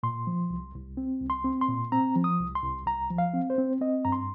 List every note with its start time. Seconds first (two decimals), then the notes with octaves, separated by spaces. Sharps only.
0.03 A#2 C6
0.27 F3
0.50 C2
0.74 C2
0.97 C4
1.22 C2
1.30 C6
1.45 C4
1.61 C6
1.69 A#2
1.92 C4 A#5
2.16 F3
2.24 D#6
2.40 C2
2.55 C6
2.63 C2
2.86 C2 A#5
3.10 F3
3.18 F5
3.33 C4
3.50 C5
3.58 C4
3.81 C4 D#5
4.05 G2 A#5
4.12 C6